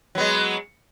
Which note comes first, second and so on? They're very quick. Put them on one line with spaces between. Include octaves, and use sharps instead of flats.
F#3 B3 G#3